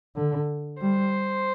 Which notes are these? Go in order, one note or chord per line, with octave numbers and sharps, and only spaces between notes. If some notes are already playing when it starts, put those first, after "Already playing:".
D3
G3 C5